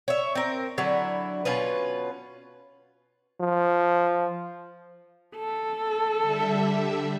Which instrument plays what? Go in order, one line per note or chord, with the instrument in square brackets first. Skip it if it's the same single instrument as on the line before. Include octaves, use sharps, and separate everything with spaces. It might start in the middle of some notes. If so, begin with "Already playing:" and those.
[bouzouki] C#5 E5
C4 A#4
D3 F#3 E4
B2 C#4 F4 B4
[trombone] F3
[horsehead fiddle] A4
[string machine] D3 G3 E5